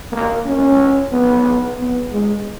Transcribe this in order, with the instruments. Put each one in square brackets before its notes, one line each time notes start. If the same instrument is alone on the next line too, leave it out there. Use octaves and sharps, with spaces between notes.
[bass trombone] A#3
C#4
B3
B3
G#3